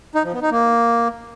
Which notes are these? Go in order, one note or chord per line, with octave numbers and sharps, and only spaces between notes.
D#4
F3
B3
D#4
A#3